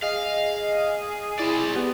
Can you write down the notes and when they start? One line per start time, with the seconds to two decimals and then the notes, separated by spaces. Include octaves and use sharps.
0.03 G#4 D#5 F5
1.39 C4 E4 D5
1.75 B3 G4